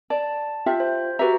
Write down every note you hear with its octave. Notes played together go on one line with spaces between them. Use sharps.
D5 A5
F4 G4 E5
C5
F#4 G4 B4 E5 A#5